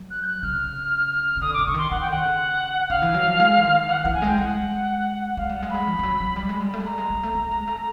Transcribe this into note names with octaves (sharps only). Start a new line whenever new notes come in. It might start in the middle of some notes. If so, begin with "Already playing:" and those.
Already playing: F#3
F#6
G6
F#6
C#3 F6
C#3
D3 D#6
D3 D6
D3 C#6
D#3 C6
D#3 F#5
G5
D3 F#5
C#3
D3 F5
E3
F#3
F3
G#3
E3
D#3
E3 F#5
E3 F#5
G#5
G#3 G5
G#3 F#5
G#3 F5
G3 F#5
G#3
G3 G#3 B5
F3
F3
F#3
F#3
G3
G#3
G3
A3
G#3
G3 A#5
G#3
G#3
A3
A3
G#3
A3